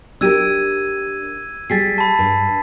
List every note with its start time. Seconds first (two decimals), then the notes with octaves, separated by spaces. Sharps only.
0.21 D4 G4 A#4 E6 G#6 D#7
1.70 G3 G#4 G5 A6 B6 C7
1.98 A5 B5
2.19 G2